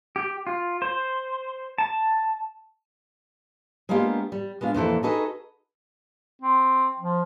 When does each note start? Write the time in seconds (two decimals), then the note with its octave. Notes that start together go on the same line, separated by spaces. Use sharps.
0.16 G4
0.47 F4
0.82 C5
1.78 A5
3.89 G#3 A#3 B3 D4 F4 G4
4.32 G3
4.61 G#3 B3 D4 F4
4.74 F2 A#2 E3 A4
5.03 D#4 F#4 G#4 A4 B4 D#5
6.42 C4
6.99 F3